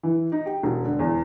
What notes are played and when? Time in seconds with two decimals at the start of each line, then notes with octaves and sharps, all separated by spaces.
0.03 E3
0.32 D#4
0.46 G4
0.63 E1
0.85 D3
0.99 E2